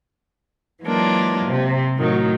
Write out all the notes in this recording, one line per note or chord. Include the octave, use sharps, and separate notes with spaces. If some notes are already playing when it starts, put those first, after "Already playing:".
E3 F#3 G#3 A#3 D4 F4
C3
A2 D#3 F#3